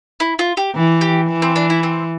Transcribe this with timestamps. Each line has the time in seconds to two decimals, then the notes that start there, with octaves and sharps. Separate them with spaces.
0.20 E4
0.39 F4
0.57 G4
0.75 E3
1.01 G4
1.29 E3
1.42 C4
1.56 D4
1.70 E4
1.83 C4